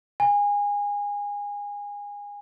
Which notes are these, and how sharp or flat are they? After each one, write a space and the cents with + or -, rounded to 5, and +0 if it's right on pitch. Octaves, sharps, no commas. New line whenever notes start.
G#5 -25